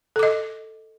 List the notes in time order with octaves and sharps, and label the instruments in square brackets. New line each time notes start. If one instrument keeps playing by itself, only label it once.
[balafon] A4
D6
D#5